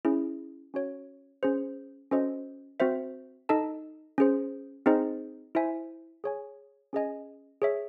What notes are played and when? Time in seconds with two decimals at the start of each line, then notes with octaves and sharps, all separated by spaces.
0.05 C#4 E4 G#4
0.74 C#4 F#4 C#5
1.43 C#4 G#4 C5
2.11 C#4 F#4 A4 C5 D#5
2.80 C4 F#4 C5 E5
3.49 D#4 A4 D#5 A5
4.18 C#4 G#4 C5
4.86 C4 D#4 G#4 C5 D#5
5.55 E4 C5 E5 G#5
6.24 G#4 C#5 G#5
6.93 C#4 G#4 D#5 G#5
7.62 G#4 C#5 E5